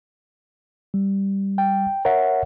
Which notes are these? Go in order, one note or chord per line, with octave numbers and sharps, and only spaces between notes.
G3
G5
A#4 C#5 E5 F#5